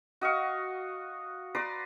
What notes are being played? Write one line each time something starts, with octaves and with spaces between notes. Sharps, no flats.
F#4 D#5 F5 C#6
B4 D5 A#5 C6